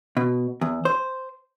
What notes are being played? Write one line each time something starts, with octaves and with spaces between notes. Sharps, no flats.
B2
E2
C5